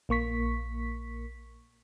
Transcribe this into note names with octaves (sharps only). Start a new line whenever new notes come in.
A#1 A#3 C#6 B6